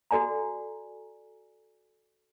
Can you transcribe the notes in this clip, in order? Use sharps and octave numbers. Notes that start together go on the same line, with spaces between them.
F#4 A4 D5 G#5 A#5